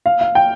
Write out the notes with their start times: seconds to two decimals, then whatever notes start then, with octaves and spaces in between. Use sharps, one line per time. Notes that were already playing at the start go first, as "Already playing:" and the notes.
0.06 F5
0.21 F5
0.35 G5